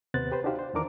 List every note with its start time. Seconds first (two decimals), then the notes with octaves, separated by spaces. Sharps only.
0.14 D#2 C3 B3 C5 F#6 A6
0.32 G4 B4 C5
0.44 D4 D#4 F#4 G4 C5 F5
0.59 C5
0.74 E2 D#3 E3 D4 A#4 D6